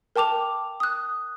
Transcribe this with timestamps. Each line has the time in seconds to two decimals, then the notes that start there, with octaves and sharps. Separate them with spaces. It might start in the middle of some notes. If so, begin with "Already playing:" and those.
0.16 A#4 G5 A5 D6 F7
0.80 D#6 F#6